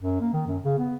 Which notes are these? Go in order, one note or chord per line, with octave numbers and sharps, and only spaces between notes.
F#2
A#3
D#3
F#2
C#3
B3